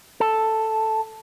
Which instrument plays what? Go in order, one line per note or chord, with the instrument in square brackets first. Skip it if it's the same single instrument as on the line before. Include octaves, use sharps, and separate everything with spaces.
[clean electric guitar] A4